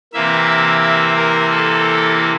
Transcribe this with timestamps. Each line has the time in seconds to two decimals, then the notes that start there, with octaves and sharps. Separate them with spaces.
0.13 C3 E3 A#3 E5
0.82 E5
1.16 A#4
1.51 A4